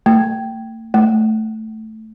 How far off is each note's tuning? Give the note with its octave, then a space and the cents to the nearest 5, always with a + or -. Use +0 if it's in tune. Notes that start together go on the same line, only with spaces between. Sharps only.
A3 +40
A3 +0